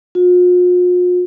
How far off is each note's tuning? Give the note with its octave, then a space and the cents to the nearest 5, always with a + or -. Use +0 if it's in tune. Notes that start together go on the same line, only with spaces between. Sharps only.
F4 +45